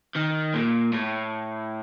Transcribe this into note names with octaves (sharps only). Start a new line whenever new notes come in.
D#3
A#2
A2